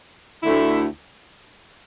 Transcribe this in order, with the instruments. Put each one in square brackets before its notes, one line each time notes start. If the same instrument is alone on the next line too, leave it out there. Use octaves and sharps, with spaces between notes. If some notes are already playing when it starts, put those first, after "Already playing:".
[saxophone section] D2 D3 A3 E4